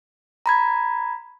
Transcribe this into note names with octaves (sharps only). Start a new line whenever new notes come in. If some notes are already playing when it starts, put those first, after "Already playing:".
A#5 B5 G#6